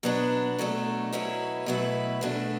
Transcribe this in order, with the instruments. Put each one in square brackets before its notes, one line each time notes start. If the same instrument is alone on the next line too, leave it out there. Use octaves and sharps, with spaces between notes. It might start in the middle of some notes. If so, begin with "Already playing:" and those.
[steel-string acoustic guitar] B2 F#3 B3 D4
B2 F#3 A3 D4
B2 F#3 C#4 E4 B4
B2 F#3 A3 E4 B4
E2 B2 A3 D4